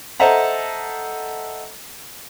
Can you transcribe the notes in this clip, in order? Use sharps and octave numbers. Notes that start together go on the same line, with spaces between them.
A4 C5 D#5 E5 F#5 A#5